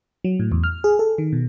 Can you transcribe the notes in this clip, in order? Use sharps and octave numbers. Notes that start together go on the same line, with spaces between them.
F#3
A2
E2
F6
G#4
A4
D#3
B2